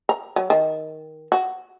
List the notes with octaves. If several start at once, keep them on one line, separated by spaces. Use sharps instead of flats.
A#5
F#3
D#3
F#4